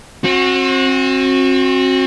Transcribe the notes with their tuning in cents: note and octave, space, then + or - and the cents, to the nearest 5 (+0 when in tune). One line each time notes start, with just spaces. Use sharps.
C4 +35 F#4 -20